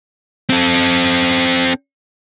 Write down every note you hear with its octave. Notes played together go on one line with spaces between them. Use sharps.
C4 A4